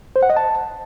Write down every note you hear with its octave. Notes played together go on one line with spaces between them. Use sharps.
C5
F#5
D#5
A5